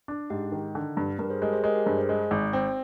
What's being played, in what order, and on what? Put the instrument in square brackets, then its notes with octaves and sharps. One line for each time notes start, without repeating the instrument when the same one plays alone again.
[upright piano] D4
[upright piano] G#2 [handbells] G4
[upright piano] D#3
D3
G2
[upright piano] G2 [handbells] G4 A#4
[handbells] G#4 C5
[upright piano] G#3 [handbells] G4 A#4
[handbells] G#4 C5
[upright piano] G#3 [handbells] G4 A#4
[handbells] G4 A#4
[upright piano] G2 [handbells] G#4 C5
[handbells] G#4 C5
[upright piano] G#3
G#1
C4